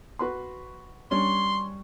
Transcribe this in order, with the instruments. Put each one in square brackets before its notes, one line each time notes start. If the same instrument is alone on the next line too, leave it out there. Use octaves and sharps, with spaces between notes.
[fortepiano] F#4 B4 C6
[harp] G3 C#6 [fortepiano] C#4 D4 [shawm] C6